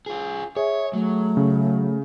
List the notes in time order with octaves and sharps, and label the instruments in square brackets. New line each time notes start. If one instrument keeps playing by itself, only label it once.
[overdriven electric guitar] F4 G#4
[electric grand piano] G#4 [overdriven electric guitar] C#5 [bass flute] E5
[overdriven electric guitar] F#3 [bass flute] A3
[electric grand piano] C#3